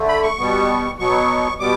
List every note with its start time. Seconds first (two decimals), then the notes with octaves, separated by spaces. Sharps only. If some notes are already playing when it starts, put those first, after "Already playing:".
Already playing: D3 A3
0.08 B5
0.23 C#6
0.38 B2 G3 B3
0.99 B2 F#3 B3 C#6
1.60 B2 G3 B3 D6